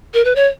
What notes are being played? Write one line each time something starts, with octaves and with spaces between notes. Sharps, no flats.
A#4
B4
C#5